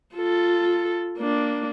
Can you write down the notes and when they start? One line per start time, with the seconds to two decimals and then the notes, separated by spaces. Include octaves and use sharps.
0.15 F4 A4
1.18 A#3 D4